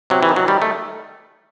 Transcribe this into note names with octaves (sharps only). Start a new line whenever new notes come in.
C3 F#3
E3
D#3
F#3
D#3 G3
A3